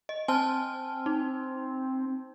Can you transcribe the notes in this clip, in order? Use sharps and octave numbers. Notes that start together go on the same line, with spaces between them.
D#5
C4 G#5 A5 F6
D#4